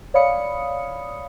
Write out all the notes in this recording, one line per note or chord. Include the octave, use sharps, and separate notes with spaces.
C#5 D5 F5 B5 D#6 C#7